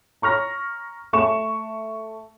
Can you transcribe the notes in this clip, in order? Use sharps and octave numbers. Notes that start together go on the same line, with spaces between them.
A#5 C#6 F6 A#6
A3 C#6 E7